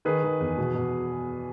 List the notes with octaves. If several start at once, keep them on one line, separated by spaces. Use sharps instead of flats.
D#3 G#4 B4
D#3
E2
B2
B2